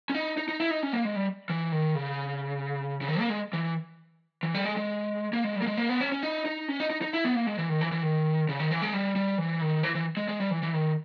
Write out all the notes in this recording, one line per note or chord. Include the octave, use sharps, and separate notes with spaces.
C#4
D#4
D#4
D#4
E4
D#4
C#4
A#3
G#3
G3
E3
D#3
C#3
C#3
D#3
A#3
G#3
E3
E3
G3
G#3
G#3
A#3
G#3
G3
A#3
G#3
A#3
B3
C#4
C#4
D#4
D#4
C#4
D#4
D#4
D#4
E4
B3
A#3
G#3
E3
D#3
E3
E3
D#3
C#3
D#3
E3
G#3
G3
G3
E3
D#3
E3
E3
G#3
G#3
G3
E3
E3
D#3